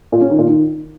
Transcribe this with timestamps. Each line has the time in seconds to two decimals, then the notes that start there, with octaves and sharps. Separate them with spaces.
0.12 A#2
0.21 C#4
0.30 D#3
0.38 A#2
0.47 D#3